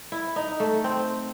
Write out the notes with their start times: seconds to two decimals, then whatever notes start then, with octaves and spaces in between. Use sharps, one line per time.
0.12 E4
0.36 D#4
0.60 A3
0.84 C4